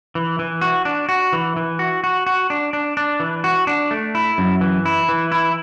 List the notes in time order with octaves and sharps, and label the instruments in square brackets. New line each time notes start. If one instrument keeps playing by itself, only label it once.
[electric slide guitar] E3
E3
F#4
D4
F#4
E3
E3
F#4
F#4
F#4
D4
D4
D4
E3
F#4
D4
A3
E4
F#2
E3
E4
E3
E4